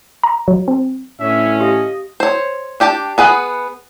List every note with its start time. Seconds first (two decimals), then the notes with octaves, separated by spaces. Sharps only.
0.24 A#5
0.48 F#3
0.68 C4
1.20 A2 D3 E3 C#4 E5
1.60 G4 D#5 F5
2.20 C5 C#5
2.80 D4 G4 G5 A5
3.18 B3 G#4 B4 F#5